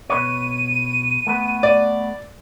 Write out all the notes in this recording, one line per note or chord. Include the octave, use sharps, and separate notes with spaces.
B2 B4 C#5 D#7
A3 B3 B4
D5